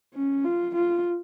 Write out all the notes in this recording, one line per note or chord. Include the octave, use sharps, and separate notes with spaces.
C#4
F4
F4